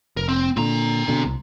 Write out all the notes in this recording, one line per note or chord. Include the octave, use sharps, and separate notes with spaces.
F1 A#4
C4
A#2 D3 C4 A#5
B2 D3
C2